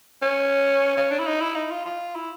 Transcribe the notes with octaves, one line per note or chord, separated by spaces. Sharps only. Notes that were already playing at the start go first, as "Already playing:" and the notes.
C#4
C#4
D4
E4
D#4
E4
D#4
F4
F4
E4